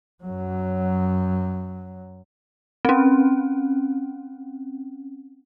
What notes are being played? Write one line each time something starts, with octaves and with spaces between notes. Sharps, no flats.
F#2 F#3
C4 C#4